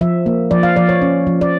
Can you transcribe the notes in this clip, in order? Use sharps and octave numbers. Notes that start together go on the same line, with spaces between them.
F3 E5
A#3
F3 D5
F5
F3 D5
C#5
C#4
F3
D5